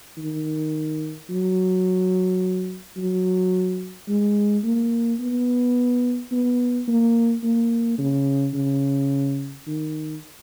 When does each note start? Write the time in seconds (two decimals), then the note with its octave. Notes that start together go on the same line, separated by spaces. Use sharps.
0.17 D#3
1.29 F#3
2.97 F#3
4.08 G#3
4.64 A#3
5.20 B3
6.32 B3
6.88 A#3
7.43 A#3
7.99 C#3
8.54 C#3
9.67 D#3